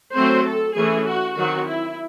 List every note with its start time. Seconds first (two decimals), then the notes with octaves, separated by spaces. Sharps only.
0.15 F#3 A3 C4 C5
0.45 A4
0.76 E3 A3 C#4 G#4
1.06 F#4
1.37 D#3 F#3 C4 F#4
1.67 E4